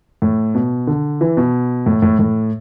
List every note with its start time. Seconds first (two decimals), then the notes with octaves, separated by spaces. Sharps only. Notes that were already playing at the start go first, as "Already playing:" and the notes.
0.22 A2
0.55 B2
0.87 D3
1.21 E3
1.37 B2
1.86 A2
2.02 A2
2.19 A2